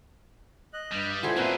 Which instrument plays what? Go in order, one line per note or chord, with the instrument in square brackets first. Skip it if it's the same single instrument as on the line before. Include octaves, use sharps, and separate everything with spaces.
[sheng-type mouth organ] D#5 F#6
[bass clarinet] G2 [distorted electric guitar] G3
[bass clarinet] A#2 [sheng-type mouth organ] E4 G#5 C6 [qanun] F#4 A4 C5
[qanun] A3 C4 C#4 [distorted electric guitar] A#3 G#4 [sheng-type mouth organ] A#4 B4 E5